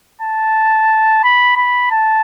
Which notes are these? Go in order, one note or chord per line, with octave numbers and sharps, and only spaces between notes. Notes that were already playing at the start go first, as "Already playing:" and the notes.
A5
B5
B5
A5